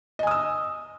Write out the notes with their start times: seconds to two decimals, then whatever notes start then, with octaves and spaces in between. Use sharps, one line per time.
0.19 D#5
0.23 G#5
0.27 D#6
0.31 E6